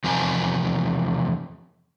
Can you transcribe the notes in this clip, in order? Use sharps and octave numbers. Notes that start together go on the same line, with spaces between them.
E2 C3 F3 A#4 G#5